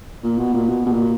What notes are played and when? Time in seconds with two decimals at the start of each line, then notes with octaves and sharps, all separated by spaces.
0.24 A#2
0.38 B2
0.54 A#2
0.69 B2
0.86 B2
0.92 A#2